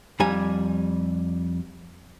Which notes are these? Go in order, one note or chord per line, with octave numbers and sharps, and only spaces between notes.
F2 G3 G#5 A#5